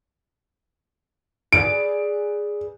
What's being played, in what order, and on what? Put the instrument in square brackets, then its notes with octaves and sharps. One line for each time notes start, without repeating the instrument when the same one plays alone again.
[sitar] G#4 B4 D5 [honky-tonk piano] D7